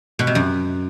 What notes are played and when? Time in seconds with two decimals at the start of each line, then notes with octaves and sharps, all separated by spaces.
0.19 B2
0.27 C3
0.35 F#2